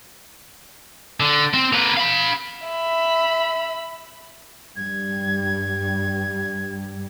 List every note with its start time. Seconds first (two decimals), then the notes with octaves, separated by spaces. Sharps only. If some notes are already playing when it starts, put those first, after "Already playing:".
1.20 D3
1.54 C4
1.73 A#3 B4
1.97 F5 B5
2.67 E5 B5
4.76 G2 G3 G#6